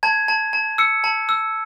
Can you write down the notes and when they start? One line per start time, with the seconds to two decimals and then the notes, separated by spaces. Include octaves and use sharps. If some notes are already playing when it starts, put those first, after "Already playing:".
0.03 A5 G#6
0.28 A5
0.53 A5
0.78 E6 C#7
1.04 A5
1.29 E6